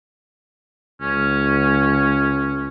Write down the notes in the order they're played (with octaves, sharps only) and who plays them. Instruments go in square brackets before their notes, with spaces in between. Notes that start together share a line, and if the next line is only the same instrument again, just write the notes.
[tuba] C#2 [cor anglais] C#4